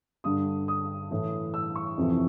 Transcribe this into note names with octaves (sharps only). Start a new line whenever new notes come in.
G2 D3 D#6
D#6
A2 E3
E6
C#6
F2 C3 E3